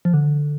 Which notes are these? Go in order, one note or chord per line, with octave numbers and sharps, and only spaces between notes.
F3
D3